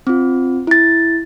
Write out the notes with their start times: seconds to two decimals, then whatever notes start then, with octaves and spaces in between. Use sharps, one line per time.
0.07 C4 F4
0.67 E4 A6